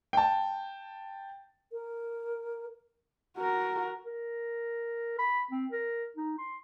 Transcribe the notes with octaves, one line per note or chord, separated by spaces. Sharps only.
G5 A5
A#4
F#4 A#4
A#4
B5
C4
A#4
D#4
C6